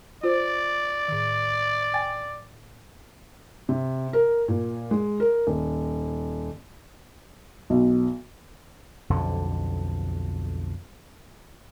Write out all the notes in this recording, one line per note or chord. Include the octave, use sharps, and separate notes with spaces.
F4 C5 D5
A2 D#3
G5 G#5 A6
C3
A#4
A#2
G#3
A#4
D#1
B1
B1 F2 D3